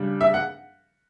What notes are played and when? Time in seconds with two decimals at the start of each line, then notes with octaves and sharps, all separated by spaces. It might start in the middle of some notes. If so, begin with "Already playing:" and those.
Already playing: C#3 G3 D4
0.21 E5
0.34 F#5